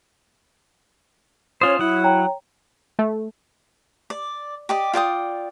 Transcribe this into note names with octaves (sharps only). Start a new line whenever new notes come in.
C#4 F4 C5 C#5 D#6
F#3 E4 F#5
C#5 G5 A#5
A3
D5
G4 D5 D#5
F4 D5 G5 D#6